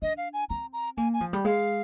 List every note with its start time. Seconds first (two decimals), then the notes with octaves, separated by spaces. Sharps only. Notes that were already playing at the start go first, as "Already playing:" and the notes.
0.02 D4 D#5
0.17 F5
0.33 G#5
0.50 C4 A#5
0.73 A#5
0.97 A#3 G#5
1.14 G#5
1.20 F3
1.33 G3
1.45 G#3 F5